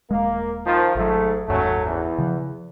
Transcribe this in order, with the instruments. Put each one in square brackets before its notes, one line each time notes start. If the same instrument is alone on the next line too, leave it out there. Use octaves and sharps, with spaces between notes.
[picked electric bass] D#1 G#3 [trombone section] A#3
[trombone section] D#3 F3
[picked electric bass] G#1 F#3 [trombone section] G#2 A3
[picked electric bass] F#1 D#2 G#2 [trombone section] F#3 A3 C#4
[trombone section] E2
[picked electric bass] C#3 F3